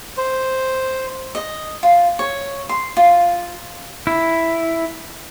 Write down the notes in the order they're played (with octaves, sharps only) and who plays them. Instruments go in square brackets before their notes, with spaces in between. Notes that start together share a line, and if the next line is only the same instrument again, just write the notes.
[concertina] C5
[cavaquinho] D#5
F4
C#5
C6
F4
[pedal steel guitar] E4